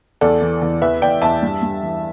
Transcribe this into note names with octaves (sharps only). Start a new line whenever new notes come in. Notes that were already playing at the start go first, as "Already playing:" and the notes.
E2 A4 D5
E3
E2
E2 B4 E5
E2 D5 G5
E2 E5 A5
G2
G2
E3